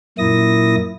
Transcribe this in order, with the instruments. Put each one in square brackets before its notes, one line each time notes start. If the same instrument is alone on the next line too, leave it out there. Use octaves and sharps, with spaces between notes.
[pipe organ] F#2 A#2 A#3 E4 D#6 A#6